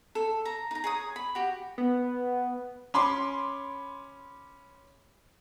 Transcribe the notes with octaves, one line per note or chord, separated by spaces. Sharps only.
A4
A#5
D#4 A#5
G#4 C#5 D#6
B5
F#4 G4
B3
C#4 B5 C6 D6